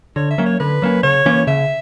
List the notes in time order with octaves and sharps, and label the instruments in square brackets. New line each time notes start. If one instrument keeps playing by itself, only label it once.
[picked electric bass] D3 [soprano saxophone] C#5
[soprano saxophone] E5
[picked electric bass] F#3 A#3 C#4
[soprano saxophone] C#5
[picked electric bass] D3 [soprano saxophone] B4
[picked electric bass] F#3 A#3 C#4
[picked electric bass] C#3 [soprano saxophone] C#5
[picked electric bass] E3 A#3 C#4
[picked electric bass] C#3 [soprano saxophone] E5